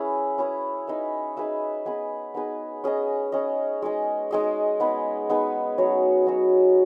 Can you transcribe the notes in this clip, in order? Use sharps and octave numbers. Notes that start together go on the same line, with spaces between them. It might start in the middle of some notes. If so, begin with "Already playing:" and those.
Already playing: C#4 E4 G#4 B4
C#4 E4 G#4 B4
D#4 G#4 B4 E5
D#4 G#4 B4 E5
B3 D#4 G#4 B4
B3 D#4 G#4 B4
C#4 G#4 D#5
C#4 G#4 D#5
G#3 D#4 G#4 D#5
G#3 D#4 G#4 D#5
B3 D#4 G#4 B4
B3 D#4 G#4 B4
F#3 C#4 F#4 C#5
F#3 C#4 F#4 C#5